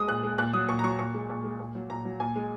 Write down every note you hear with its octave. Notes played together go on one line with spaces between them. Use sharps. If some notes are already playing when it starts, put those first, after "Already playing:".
Already playing: G#3 D#6
A#2 F#6
G#3
A#2 F#6
F#3 D#6
A#2 C#6
A#5
F#3 C#6
A#2 C#6
G#3
A#2
G#3
A#2
F#3
A#2 A#5
F#3
A#2 G#5
G#3